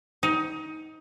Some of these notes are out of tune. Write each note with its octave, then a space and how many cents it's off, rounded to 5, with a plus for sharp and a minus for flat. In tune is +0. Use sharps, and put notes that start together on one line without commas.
D#4 +20